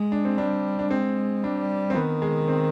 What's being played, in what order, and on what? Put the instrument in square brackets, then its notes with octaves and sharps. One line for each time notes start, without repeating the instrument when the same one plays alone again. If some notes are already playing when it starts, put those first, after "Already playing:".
Already playing: [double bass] G#3
[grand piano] D4
C4
[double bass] G3 [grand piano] D4
[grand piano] D4
[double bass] G#3 [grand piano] C4
[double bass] G3 [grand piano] D4
[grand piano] C4
[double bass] D#3 [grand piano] B3
[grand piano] G#3
C4